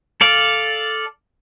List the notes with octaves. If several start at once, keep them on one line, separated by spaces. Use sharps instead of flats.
A4 D5 F5